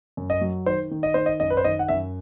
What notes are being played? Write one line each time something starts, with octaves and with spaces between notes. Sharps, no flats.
F#2
D#5
F#3
D#3 C5
D#3
D#5
D#3 C5
D#5
F#2 D#5
B4
C5
D#3 D#5
F#5
F#2 E5